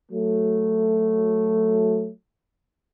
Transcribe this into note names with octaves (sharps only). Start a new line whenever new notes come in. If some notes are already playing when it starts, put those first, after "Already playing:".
F#3 A3